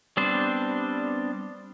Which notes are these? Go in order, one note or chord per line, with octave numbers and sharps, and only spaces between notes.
G3 B3 C4 D4 C5